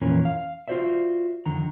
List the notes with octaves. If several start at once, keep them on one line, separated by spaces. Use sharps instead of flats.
F2 A#2 E3 C#4 A#4
F5
F4 F#4 G#4 C5 D5 E5
F2 D3 D#3 A#5